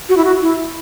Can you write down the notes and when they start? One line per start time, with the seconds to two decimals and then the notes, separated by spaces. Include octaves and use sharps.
0.09 F#4
0.17 E4
0.25 F#4
0.41 E4